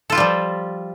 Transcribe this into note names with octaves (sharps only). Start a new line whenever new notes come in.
F3 G3 F4 G4 A4